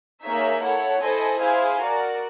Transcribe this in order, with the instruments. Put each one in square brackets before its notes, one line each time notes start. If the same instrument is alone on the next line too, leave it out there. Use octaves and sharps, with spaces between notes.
[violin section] A#3 D#4 G#4 C#5 E5
E4 A4 C#5 F#5
E4 A4 C5 D#5 G#5
E4 G#4 C5 F5 G#5
F#4 A#4 D5